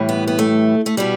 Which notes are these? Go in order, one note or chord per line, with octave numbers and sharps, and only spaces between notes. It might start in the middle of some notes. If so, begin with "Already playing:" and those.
Already playing: A2 E3 G3
B3
B3
A3
A3
B2 G3 B3